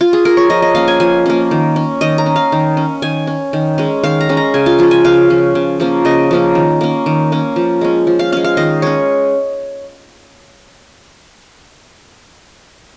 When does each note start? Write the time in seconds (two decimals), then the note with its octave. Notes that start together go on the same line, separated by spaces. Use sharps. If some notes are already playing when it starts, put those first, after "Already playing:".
0.01 F4
0.13 G#4
0.25 A#4
0.37 C#5
0.50 F3 D#5
0.62 D#5
0.75 A#3 C#4 F5
0.88 G#5
1.00 F3 G#5
1.26 A#3 C#4
1.51 D#3
1.76 C#4
2.01 D#3 D#5
2.18 A#5
2.26 C#4
2.36 F5
2.52 D#3
2.77 C#4
3.02 D#3 G#5
3.27 C#4
3.53 D#3
3.78 G#3 C#4
4.03 D#3 F5
4.21 A#5
4.29 G#3 C#4
4.37 A#5
4.54 C#3 G#5
4.66 F4
4.79 F3 C#4 F4
4.91 G#5
5.04 C#3 F5
5.30 F3 C#4
5.55 C#3
5.80 F3 A#3 C#4
6.05 C#3 D#5
6.31 F3 A#3 C#4
6.55 D#3
6.81 A#3 C#4
7.06 D#3
7.32 A#3 C#4
7.56 F3
7.81 G#3 C#4
8.07 F3
8.19 F5
8.32 G#3 C#4 F5
8.44 F5
8.57 D#3 D#5
8.82 G#3 C#4 C#5